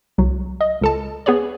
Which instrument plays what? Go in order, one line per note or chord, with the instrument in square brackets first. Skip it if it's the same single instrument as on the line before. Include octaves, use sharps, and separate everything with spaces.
[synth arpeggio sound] C2 F#3
D#5
C#2 A4 A5
B3 G#4 B4 C#5 D5